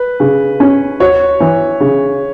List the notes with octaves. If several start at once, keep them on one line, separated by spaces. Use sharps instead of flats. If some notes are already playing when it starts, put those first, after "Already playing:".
Already playing: B4
C#3
C#4
F#4 C#5
E3
C#3